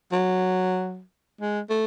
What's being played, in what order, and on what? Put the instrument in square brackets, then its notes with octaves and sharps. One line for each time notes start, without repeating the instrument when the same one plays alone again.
[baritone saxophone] F#3
G#3
A3